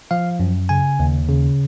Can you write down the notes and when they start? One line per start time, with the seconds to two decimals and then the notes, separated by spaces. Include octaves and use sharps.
0.11 F3 F5
0.40 F#2
0.69 C#3 G#5
1.00 D#2
1.29 C#3